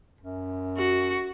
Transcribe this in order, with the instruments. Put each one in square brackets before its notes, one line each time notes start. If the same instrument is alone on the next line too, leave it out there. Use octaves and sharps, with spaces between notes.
[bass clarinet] F#2
[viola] F#4